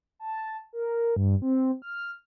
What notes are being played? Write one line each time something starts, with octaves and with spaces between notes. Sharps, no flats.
A5
A#4
G2
C4
F6